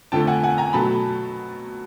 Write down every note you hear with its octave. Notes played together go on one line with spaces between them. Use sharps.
F2 D3 F3 A3 G5 A5
F#5 G#5
F#5 G#5
G#5 A#5
B2 F#3 A3 A5 B5